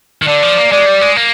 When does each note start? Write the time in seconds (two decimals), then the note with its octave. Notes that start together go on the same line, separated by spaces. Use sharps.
0.22 D#3
0.27 D3 D5
0.42 F3
0.57 A#3
0.71 G#3 D5
0.86 G3
1.01 G#3
1.16 A#3